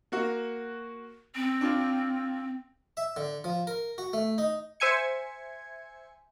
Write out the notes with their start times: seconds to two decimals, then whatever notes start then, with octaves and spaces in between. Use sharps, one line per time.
0.12 A#3 F#4
1.35 C4
1.61 D4 F4
2.97 E5
3.17 D3
3.44 F3
3.67 A#4
3.98 F#4
4.13 A3
4.38 D#4
4.80 C5 E5 G#5 G#6 C#7